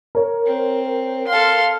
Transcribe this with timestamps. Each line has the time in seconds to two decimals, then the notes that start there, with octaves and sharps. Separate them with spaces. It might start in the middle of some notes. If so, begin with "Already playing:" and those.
0.15 A#4 C#5
0.46 C4
1.28 A4 F5 C6